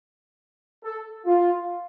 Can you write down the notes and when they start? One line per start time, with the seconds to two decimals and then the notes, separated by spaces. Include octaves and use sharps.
0.84 A4
1.26 F4